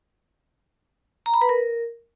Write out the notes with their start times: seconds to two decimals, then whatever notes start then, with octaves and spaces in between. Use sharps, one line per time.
1.26 A#5
1.34 B5
1.42 B4
1.49 A#4